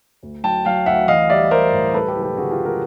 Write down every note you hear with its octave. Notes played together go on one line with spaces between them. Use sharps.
D2
F#3 G5 A5
F#3 F5 G5
D2 E5 F#5
E3 D#5 F5
G3 D5 E5
G3 A#4 C5
A2
G3 A4 B4
G4 A4
F#1
G4 A4
D3 F#4 G#4
F4 G4
G3
G#4 A#4